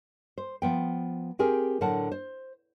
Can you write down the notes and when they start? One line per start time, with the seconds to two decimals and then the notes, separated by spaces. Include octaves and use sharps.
0.38 C5
0.62 F3 B3 G5
1.39 C4 G4 G#4 A#4
1.81 A2 D3 F#3 A#4 F#5 A5
2.12 C5